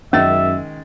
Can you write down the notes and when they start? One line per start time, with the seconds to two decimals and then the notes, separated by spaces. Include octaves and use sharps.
0.13 F#2 D#3 G#3 C#4 E5 A6